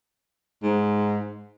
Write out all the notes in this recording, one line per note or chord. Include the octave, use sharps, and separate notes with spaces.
G#2